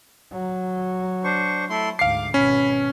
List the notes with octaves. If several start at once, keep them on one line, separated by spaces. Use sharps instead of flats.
F#3
D4 C5 C#6
A3 E4 C6
D2 G#2 F5 D6 C7
G#1 B2 C#4 B5